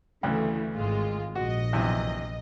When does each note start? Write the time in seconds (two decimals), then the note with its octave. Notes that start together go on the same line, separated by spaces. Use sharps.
0.23 D2 C#3 E3 A3
0.75 G#1 G#3 F4
1.35 A#1 F#4 D#5
1.73 B1 E2 C3